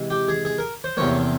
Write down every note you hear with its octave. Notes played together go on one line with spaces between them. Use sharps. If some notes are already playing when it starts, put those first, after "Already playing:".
Already playing: C3 E3 G#3
G4
G#4
G#4
A#4
C5
E2 C3 F3 A#3 C#5